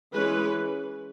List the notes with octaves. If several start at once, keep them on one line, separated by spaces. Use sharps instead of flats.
E3 G#3 C#4 B4